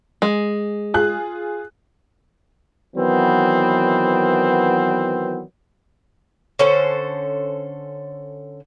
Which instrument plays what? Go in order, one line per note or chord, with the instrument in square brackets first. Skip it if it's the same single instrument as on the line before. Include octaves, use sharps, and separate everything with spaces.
[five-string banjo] G#3
[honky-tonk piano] F4 G#4 F#6
[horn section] D#3 E3 F#3 B3 C4
[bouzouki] D3 C#4 A4 C5